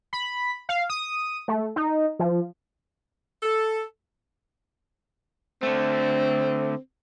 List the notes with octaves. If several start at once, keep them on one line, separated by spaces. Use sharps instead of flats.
B5
F5
D#6
A3
D#4
F3
A4
D3 A3 C4